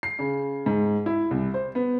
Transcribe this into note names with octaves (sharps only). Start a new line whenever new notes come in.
C7
C#3
G#2
E4
C2
C5
B3